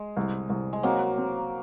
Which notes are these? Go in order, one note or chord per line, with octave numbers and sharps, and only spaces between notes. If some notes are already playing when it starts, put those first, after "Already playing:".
Already playing: G#3
C2
C2
G#3
F#3 A#3 C4
C4